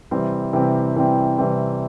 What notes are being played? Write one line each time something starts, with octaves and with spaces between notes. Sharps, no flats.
C3 E3 G3 C4
C3 E3 G3 C4
C3 E3 G3 C4
C3 E3 G3 C4